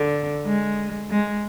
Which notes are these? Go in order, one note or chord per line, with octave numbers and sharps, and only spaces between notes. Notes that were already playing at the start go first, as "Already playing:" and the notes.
Already playing: D3
G#3
G#3